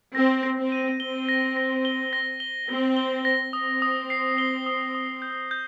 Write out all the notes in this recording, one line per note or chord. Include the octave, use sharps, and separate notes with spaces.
C4 A#6
A#6
C4
D#7
C4 G7
A#6
A#6
G7
A#6
G7
C4 A#6
G7
A#6
C4 D#6
D#6
C7
G7
D#6
D#6
G6
G6